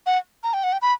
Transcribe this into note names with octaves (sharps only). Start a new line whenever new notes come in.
F#5
A#5
G5
F#5
G5
B5